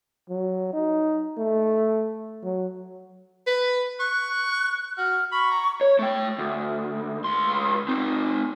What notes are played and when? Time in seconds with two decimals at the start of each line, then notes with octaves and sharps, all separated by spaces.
0.29 F#3
0.73 D#4
1.38 A3
2.43 F#3
3.47 B4
4.00 C#6 F#6
4.98 F#4 F6
5.32 B5 C#6
5.51 A#5
5.81 C#5
5.99 A3 G5
6.38 D2
7.24 C#2 C6
7.89 C4 D#4